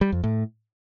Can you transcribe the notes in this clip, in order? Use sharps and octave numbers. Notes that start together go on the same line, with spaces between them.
G3
F2
A2